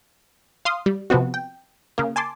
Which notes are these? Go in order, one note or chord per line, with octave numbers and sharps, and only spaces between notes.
F5 C6 D#6
G3
C3 F3 B3 C4 F#4
G5
C#3 A#3
G#5 A5 C6 D6